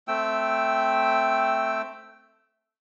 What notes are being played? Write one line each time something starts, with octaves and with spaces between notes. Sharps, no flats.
A3 C4 G5 E6